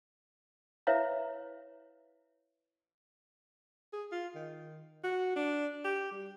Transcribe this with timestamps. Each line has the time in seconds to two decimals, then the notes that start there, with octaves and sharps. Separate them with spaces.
0.87 E4 B4 C#5 E5 F5 A#5
3.93 G#4
4.12 F4
4.35 D#3
5.04 F#4
5.36 D4
5.85 G4
6.11 G3